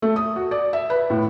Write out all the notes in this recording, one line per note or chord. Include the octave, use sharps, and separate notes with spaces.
A3
D#6
F#4
D5
E5
B4
A2